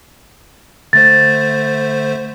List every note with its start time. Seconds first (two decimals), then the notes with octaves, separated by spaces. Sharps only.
0.93 D3 A3 C5 A6